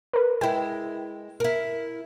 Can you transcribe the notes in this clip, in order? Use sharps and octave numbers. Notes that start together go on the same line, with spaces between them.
A#4 B4
G#3 E4 G5
E4 A#4